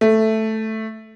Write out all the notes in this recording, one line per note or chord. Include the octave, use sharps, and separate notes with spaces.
A3